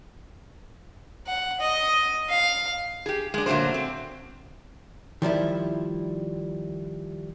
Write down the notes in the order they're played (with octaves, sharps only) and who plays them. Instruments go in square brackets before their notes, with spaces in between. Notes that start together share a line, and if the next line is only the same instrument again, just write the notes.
[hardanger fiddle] F#5
D#5
F5
[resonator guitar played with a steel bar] G4 G#4
G#3 D4
A#2 D3 F#3 A3 C4 C5
C4
[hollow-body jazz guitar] D#3 F3 G3 E4